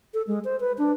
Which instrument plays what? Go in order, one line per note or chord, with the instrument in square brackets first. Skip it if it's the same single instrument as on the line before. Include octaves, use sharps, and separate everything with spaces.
[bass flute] A4
G#3
C5
B4
D4